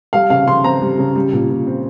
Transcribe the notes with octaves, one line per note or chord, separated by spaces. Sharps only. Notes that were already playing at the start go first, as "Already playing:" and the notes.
G3 F5
C#3 F5
C#3 C6
C4 A#5
G3
C#3
G3
A#2
A#2
C4